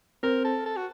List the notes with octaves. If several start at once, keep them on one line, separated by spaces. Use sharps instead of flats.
C4 A#4
A4
A4
F#4